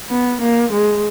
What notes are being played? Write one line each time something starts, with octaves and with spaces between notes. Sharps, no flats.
B3
A#3
G#3